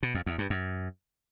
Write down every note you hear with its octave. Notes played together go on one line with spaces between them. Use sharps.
B2
F2
E2
G2
F#2